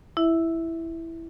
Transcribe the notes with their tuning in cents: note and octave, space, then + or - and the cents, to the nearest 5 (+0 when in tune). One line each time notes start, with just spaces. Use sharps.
E4 +0 E5 -10